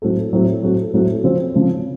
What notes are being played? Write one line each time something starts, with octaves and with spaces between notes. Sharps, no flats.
A2 F#3 C4 F#4 A4
A2 F#3 C4 F#4 A4
A2 F#3 C4 F#4 A4
A2 F#3 C4 F#4 A4
C#3 F3 C4
C#3 F3 C4